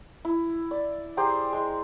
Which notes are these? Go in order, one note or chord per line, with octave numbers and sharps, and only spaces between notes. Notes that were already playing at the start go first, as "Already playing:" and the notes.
E4
D5
G4 G#4 C5 A#5
G#3